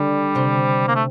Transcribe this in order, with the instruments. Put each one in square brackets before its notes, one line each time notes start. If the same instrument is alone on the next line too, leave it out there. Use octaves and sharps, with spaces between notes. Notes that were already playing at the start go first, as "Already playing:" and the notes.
Already playing: [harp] D3 D4 [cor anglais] G3
[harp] C3 C4
[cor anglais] A#3
A3